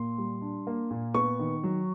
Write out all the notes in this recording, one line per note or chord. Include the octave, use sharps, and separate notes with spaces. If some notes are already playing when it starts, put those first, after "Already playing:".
Already playing: A#2 A#3 C6
G3
D4
A#3
A#2
B3 C#6
D#3
F#3